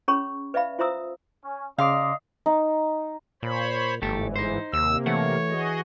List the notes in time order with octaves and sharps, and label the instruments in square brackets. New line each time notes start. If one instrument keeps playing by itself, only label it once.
[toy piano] C#4 G#4 C#5 B5 C#6
B4 D5 E5 F5 B5
F4 C5 E5 A#5 D#6 E6
[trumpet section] C#4
[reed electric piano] C#3 C6 D6 [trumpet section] D#4 D5 D#5 [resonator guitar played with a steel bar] F5
[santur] D#4
[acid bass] A#2 [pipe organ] C5 C#5 B5
[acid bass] G1 [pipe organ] G#2 E3 [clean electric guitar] A3 G4 A4
[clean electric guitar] D#4 C5
[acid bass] D#2 [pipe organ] C3 A#3 [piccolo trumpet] E6
[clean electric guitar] E3 F#5 [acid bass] A3 [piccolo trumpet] C#5
[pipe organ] F#4 G#4 D#5